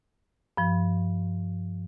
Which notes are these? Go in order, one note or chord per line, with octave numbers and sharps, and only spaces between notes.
G2 F3